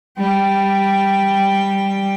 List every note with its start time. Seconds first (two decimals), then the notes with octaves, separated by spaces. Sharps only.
0.18 G3 G5